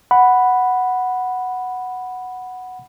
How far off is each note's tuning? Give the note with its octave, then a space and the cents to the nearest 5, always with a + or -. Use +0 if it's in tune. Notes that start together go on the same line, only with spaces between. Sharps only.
F#5 +0 B5 +0